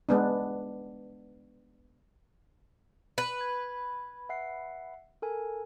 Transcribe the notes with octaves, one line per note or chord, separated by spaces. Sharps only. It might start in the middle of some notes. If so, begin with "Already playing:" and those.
G#3 B3 D4
B4
G#6
E5 F#5 C7
A4 A#4 G#5